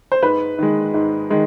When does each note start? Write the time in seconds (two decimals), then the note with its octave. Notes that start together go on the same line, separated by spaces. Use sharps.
0.12 C5
0.23 G#2 B4
0.58 D#3 G#3
0.94 G#2
1.30 D#3 G#3